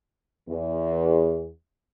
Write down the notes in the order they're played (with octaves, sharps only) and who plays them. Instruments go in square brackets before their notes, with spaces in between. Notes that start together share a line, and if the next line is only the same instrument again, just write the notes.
[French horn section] E2